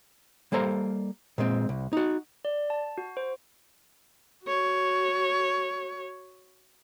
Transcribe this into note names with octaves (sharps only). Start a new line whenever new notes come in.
G3 A#3 A4 C5 A#5
A#2 G#3 C4
C2
D#4 F#4
D5
A5
F#4
C5
F#4 C#5